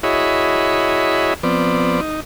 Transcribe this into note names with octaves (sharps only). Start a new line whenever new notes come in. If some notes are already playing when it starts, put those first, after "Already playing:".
E4 F#4 G#4 C#5 D#5 B5
F3 B3 C4 D5
D#4